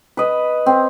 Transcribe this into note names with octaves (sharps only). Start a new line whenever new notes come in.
B4 D#5
C4